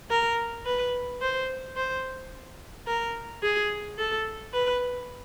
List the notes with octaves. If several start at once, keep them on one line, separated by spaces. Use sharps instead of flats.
A#4
B4
C5
C5
A#4
G#4
A4
B4